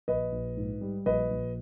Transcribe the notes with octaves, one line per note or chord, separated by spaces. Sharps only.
A#1 B4 D#5
A#1
G#2
G3
A#1 B4 D#5
A#1